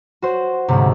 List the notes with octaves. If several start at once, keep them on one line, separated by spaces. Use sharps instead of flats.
F#4 C5
D2 G#2 C3